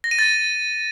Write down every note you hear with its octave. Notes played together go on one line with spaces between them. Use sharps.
A#6
D#7
A6